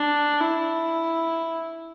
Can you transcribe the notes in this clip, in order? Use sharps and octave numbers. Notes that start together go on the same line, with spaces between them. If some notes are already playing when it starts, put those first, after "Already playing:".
Already playing: D4
E4